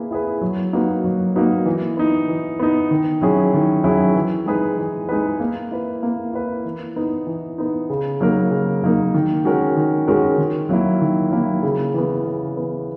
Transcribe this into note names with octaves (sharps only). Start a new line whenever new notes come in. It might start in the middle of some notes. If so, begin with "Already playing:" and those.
Already playing: A#3 E4 G#4 B4
E4 G#4 B4
F#3
A#3 D#4 F#4 B4
F#3
A#3 D#4 F#4 B4
E3
B3 D#4
E3
B3 D#4
D#3
F#3 C#4 E4 G#4
D#3
F#3 C#4 E4 G#4
E3
G#3 D#4 G#4 B4
E3
G#3 D#4 G#4 B4
A#3
E4 B4
A#3
E4 B4
E3
B3 D#4
E3
B3 D#4
C#3
F#3 A#3 D#4 A#4
C#3
F#3 A#3 D#4 A#4
D#3
G#3 C#4 F#4 A#4
D#3
G#3 C#4 F#4 A#4
D#3
F#3 A#3 E4
D#3
F#3 A#3 E4
C#3
E3 B3
C#3
E3 B3